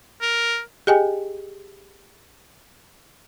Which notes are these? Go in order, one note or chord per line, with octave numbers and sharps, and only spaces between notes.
A#4
G4 G#4 D#5 G5 G#5